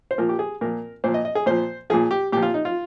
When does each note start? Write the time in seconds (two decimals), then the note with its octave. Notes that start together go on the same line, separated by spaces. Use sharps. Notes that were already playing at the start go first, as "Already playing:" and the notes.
0.11 C5
0.18 A#2 F3 A#4
0.29 G4
0.39 G#4
0.61 A#2 F3 A#4
1.04 A#2 F3 C5
1.14 D#5
1.25 D#5
1.35 G#4
1.46 A#2 F3 C5
1.90 A#2 F3 G#4
2.11 G4
2.32 A#2 G4
2.37 F3
2.42 F4
2.54 D#4
2.65 F4